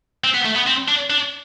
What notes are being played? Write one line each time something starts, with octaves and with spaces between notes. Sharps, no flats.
C4
B3
A3
B3
C4
D4
D4